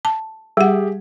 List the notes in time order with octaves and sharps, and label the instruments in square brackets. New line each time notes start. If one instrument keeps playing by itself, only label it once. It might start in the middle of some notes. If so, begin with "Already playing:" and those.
[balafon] A5
[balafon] G3 F#5 [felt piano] G4 G#4 E5